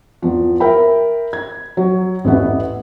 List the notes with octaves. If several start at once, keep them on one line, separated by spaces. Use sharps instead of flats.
E2 F3
A#4 E5 G5 B5
G#6
F#3
A1 E2 A3 B3 E5